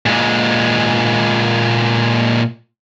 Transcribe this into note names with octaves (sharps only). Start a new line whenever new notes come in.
A#2 G#3